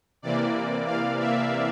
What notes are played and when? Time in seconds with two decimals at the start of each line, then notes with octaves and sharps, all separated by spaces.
0.22 C3 E3 A#3 D5
0.86 F5
1.19 E5